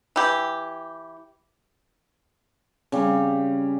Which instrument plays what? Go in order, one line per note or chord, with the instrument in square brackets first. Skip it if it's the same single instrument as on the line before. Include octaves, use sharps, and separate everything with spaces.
[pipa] E3 G4
[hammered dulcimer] C#3 G3